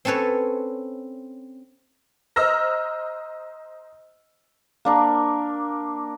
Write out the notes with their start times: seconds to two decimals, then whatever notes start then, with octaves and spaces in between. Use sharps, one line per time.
0.05 C4 C#4 A4 B4 C#5
2.36 C5 D#5 A#5 E6 F6 A#6
4.85 A#3 D4 A#4